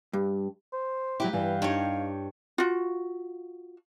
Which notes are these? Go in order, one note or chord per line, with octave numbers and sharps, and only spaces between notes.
G2
C5
F#3 E4 G4 B4
G2 E3 F5
G2 D#4 C#5
F4 F#4